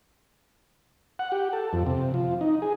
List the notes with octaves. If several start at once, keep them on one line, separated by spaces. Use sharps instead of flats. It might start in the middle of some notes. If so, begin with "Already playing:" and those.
F#5
G4
A4
F2
C3
F3
D#4
G#4